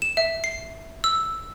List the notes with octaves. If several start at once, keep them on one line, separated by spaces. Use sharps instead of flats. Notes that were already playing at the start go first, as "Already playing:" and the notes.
E7
E5
C7
E6